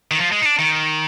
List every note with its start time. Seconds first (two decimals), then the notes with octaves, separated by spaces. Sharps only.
0.11 D#3
0.19 F3
0.32 G#3
0.42 D#4
0.45 D4
0.59 D#3